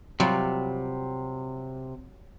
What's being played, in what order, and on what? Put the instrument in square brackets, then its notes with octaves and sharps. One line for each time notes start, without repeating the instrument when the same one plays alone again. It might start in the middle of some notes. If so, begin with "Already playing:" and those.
[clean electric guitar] C3 [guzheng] F#3 G3 F4